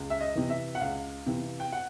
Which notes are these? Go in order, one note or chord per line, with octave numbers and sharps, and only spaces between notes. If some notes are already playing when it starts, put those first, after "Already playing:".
Already playing: C#2
E5
D#5
C3 E3
E5
F#5
C#2 F5
C3 E3
G5
F#5